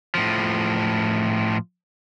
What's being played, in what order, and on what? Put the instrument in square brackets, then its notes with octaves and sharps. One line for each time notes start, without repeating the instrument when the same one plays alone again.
[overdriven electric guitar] A2 F3